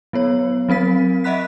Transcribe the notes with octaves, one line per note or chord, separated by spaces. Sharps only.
F#3 B3 C#5
F#3 C4 A#4 B6
D#5 E5 F#5 B5 F#6 B6